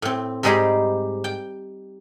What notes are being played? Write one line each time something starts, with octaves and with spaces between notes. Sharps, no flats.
A2 C4
G#2 G3 G#3 D#4 G4 G#4
G5